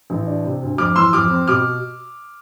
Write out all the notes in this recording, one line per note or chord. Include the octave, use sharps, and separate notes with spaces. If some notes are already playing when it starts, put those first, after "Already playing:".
A1
D4
C3
D2
F2 D6 F6
E3 C6 E6
F2 D6 F6
C4
B2 D6 F6